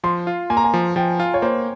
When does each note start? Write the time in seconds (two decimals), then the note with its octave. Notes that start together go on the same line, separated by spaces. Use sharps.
0.04 F3 C6
0.27 F4
0.50 A#3 G#5
0.57 A#5
0.64 G#5
0.74 F3
0.96 F3 G5
1.20 F4
1.34 C#5
1.42 A#3 C5